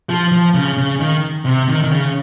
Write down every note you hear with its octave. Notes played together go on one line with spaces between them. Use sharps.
F3
F3
C#3
C#3
D#3
C3
D#3
D#3
C#3